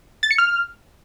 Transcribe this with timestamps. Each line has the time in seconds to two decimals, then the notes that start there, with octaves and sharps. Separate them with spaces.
0.23 A6
0.31 C#7
0.38 F6